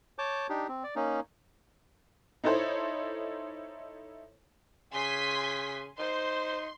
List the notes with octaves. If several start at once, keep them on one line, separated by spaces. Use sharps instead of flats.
C#5 A5 D6 G6
D4 D#4 G4
C4
D5
A#3 C#4 D#4
D#4 E4 A4 C5 C#5
C#3 G#5 C6 B6
D#4 C5 C6